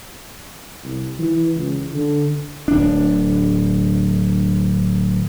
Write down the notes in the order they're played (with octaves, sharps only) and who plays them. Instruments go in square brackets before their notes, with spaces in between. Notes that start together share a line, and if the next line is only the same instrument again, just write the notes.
[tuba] C2
E3
C#2
D3
[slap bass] D1 D4